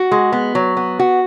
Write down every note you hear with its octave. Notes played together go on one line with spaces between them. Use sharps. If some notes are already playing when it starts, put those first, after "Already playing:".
Already playing: F#4
G#3
B3
F#3
B3
F#4